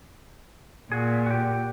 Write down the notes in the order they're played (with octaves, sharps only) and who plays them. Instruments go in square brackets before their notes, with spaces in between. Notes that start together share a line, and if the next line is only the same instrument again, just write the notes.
[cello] A#2 [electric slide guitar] F#4 G#4
[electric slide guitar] F#4 G4